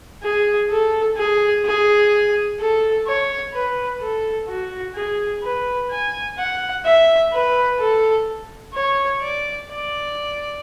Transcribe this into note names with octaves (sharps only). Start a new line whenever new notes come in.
G#4
A4
G#4
G#4
A4
C#5
B4
A4
F#4
G#4
B4
G#5
F#5
E5
B4
A4
C#5
D5
D5